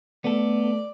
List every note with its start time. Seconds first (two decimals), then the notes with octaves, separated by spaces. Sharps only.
0.24 A3 B3 A4 D5